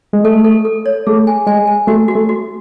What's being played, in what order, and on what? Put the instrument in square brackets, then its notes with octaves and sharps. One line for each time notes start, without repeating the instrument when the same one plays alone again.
[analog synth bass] G#3
[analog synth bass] A3 [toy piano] A4
[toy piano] A4
A4
C#5
[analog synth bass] A3 [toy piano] G#4
[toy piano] G#5
[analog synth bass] G#3 [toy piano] G#5
[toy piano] G#5
[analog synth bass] A3 [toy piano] F#4
[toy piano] F#4
[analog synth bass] A3
[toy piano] F#4